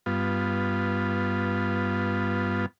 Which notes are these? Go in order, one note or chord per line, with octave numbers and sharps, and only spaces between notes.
G2 B3 F4